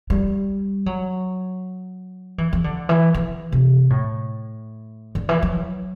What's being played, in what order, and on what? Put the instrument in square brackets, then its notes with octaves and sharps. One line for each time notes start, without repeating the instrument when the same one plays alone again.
[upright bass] G3
F#3
E3
E3
D3
E3
E3
C3
A2
D3
E3
F#3